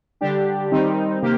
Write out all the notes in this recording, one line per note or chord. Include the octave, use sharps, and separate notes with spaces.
D3 G3 D4 G4
D#3 G3 C4 D#4
C3 D#3 A#3 G4